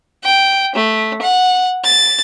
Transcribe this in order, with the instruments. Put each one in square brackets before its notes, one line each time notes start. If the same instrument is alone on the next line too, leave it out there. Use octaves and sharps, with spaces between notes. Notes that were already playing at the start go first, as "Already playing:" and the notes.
[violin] G5
A3
F#5
A6